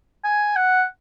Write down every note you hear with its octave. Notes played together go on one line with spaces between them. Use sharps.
G#5
F#5